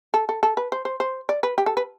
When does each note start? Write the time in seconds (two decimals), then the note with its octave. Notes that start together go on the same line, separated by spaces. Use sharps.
0.14 A4
0.29 A4
0.43 A4
0.57 B4
0.72 C5
0.85 C5
1.00 C5
1.29 D5
1.43 B4
1.58 G4
1.66 A4
1.77 B4